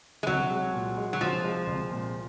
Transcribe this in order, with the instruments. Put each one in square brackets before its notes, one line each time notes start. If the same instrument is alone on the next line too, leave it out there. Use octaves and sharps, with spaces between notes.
[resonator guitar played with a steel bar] G#3
[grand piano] C2 [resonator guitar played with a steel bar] F#3
[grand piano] G#3
A#2
G#3
[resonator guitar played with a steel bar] F#3
[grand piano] C2 [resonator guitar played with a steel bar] F3
[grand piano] G#3
C2
A#2